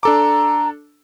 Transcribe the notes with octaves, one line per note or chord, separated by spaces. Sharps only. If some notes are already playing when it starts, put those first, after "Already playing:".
D4 A4 A#5 D6